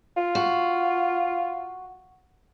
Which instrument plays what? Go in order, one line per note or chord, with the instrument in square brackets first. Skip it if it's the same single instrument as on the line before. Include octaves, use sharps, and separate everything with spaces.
[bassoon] F4
[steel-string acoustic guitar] F#4